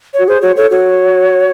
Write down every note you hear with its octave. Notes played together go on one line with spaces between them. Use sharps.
C#5
F#4
G#4 C5
F#4 C#5
A4 C#5
F#4 C#5